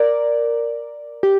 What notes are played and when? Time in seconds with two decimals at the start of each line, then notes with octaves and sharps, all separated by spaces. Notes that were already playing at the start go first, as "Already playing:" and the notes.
Already playing: A#4 D5
1.23 G4